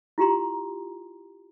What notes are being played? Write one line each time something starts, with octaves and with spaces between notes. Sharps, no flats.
E4 F4 G4 A#5 C6